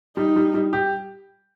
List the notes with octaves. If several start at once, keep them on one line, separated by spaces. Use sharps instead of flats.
G3 D#4
G3
G3
G4